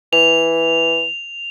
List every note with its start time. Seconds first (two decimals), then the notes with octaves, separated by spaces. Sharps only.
0.13 E3 F7